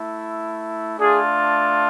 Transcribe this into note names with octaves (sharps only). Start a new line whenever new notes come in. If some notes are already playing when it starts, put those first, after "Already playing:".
Already playing: A3 E4
A3 D4 F4 G#4